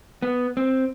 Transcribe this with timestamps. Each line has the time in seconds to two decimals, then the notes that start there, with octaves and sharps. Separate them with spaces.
0.22 B3
0.57 C4